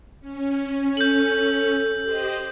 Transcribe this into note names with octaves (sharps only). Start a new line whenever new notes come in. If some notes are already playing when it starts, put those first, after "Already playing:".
C#4
A4 G6 F#7
G4 C5 D#5